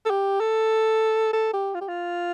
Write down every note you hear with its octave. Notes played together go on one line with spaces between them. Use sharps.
A4
G4
A4
A4
G4
F4
G4
F4